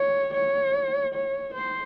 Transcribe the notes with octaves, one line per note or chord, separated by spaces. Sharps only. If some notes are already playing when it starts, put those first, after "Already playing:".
Already playing: C#5
C#5
C#5
C5